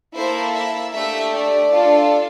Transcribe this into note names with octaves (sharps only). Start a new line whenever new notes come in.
A#3 E4 A4 C5
E5
A3 D4 G4 E5
D5
D4 F4 A4